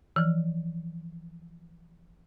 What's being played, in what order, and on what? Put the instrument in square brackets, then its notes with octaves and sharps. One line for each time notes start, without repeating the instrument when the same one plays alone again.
[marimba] E3 F3